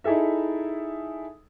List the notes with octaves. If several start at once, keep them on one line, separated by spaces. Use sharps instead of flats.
D#4 E4 G#4 A4 E5